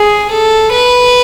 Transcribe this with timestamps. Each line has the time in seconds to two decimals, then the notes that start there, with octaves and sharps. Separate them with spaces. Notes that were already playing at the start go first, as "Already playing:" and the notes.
Already playing: G#4
0.31 A4
0.73 B4